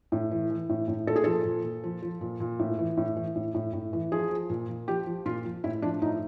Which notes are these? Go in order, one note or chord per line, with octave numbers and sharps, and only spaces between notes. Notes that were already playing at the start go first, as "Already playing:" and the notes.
A2
E3
E3
A2
A2
A#2 A4
G#4
F3 A4
A#2
A#2
F3
F3
A#2
A#2
A2
E3
A2
E3
A2
A2
A2
E3
F3 G#4
F3
A#2
A#2
F3 G4
F3
A#2 F4
F3
A2 E4
F3 D4
A2 D#4